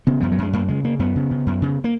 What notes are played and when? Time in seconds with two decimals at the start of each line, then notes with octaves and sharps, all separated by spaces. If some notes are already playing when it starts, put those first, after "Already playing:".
0.07 C#3 B3
0.20 F#2 F3
0.32 F#3
0.38 F#2 G#3
0.53 F#2 A#3
0.68 C#3 G#3
0.84 C#3 A#3
0.99 F#2 B3
1.16 C#3
1.31 C#3
1.47 F#2
1.62 C#3
1.84 A#3